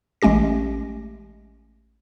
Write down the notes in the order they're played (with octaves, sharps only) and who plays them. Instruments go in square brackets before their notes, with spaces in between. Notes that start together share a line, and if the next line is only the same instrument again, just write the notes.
[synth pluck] A1 G#3 A3 C#4 G4 A#6